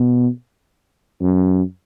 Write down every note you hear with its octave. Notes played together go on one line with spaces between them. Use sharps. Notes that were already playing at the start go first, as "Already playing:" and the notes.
Already playing: B2
F#2